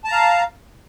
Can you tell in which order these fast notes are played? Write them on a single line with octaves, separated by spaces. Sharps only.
A5 A#5 F5